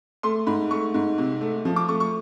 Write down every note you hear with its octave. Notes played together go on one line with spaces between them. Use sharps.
A3 C6
G#2 B5
A3 C#6
G#2
C3
A3
F3
D6
A3 C#6
C#6